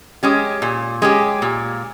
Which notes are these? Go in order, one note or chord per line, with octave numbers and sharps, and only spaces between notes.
G#3 C#4 G4
A#2
G#3 C#4 G4
A#2